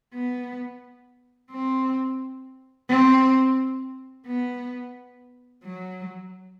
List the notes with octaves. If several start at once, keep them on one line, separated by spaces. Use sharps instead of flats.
B3
C4
C4
B3
F#3